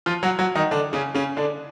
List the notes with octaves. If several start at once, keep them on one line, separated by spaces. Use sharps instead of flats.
F3 F4
F#3 F#4
F#3 F#4
D#3 D#4
D3 D4
C#3 C#4
C#3 C#4
D3 D4